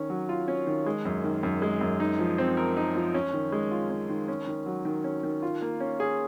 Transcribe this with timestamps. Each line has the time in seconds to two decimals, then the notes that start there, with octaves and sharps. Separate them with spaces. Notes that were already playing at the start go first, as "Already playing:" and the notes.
Already playing: D#3 C#4
0.10 F#3
0.29 F4
0.48 C#4
0.67 D#3
0.86 G#3
1.05 F#2
1.24 D#3
1.43 F#2
1.62 G#3
1.81 F#2
2.00 D#4
2.19 F3
2.38 C4
2.57 A#4
2.77 D#4
2.95 F3
3.14 C#4
3.33 D#3
3.52 G#3
3.71 F4
3.90 C#4
4.09 D#3
4.28 C#4
4.47 D#3
4.66 F#3
4.85 D#3
5.04 C#4
5.23 D#3
5.42 F4
5.62 A#3
5.80 C#4
6.00 G#4